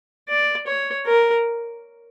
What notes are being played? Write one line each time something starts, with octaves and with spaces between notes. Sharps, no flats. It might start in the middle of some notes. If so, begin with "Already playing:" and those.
D5
C#5
A#4